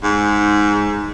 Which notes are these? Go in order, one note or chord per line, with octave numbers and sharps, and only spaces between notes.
G#2